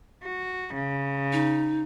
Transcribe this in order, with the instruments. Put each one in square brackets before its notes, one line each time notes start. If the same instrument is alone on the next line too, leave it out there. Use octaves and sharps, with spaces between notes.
[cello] F#4
C#3
[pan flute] D#4